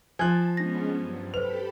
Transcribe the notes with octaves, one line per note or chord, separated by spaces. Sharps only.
F3 G#5 A5 F#6 G#6
G#3 B3 C#4 D4 A#6
G2 F#3
G4 A4 B4 C5 B5 F7